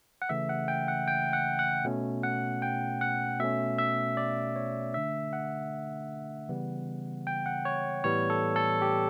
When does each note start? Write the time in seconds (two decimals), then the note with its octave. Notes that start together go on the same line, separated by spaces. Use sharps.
0.22 F#5
0.29 C#3 E3 A3 C#4 E5
0.49 F#5
0.68 G5
0.88 F#5
1.08 G5
1.33 F#5
1.59 F#5
1.85 B2 A3 C#4
2.23 F#5
2.62 G5
3.01 F#5
3.39 B2 A3 C#4 E5
3.78 E5
4.17 D5
4.56 C#5
4.94 D3 A3 D4 E5
5.33 F#5
6.49 C#3 E3 G3 B3
7.27 G5
7.46 F#5
7.65 C#5
8.04 A2 E3 G3 B3 C#5
8.30 A4
8.56 A4
8.82 G4